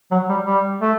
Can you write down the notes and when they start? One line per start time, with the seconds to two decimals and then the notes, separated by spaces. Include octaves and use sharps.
0.11 F#3
0.29 G3
0.46 G3
0.81 A3